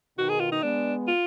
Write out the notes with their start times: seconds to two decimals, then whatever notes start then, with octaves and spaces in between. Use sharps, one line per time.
0.18 B2 D#3 F#4
0.29 G#4
0.40 F4
0.52 D#4
0.63 G#3 B3 D4
1.08 F4